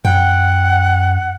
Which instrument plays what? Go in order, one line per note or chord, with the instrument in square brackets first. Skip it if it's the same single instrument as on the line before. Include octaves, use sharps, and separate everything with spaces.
[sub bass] F#2 [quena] F#5 [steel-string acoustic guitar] G5